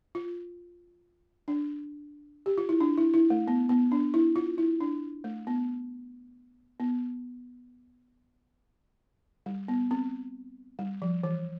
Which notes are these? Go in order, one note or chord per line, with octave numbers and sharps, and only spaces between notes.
F4
D4
G4
F4
E4
D4
E4
E4
A3
B3
B3
D4
E4
F4
E4
D4
A3
B3
B3
G3
B3
C4
G3
F3
E3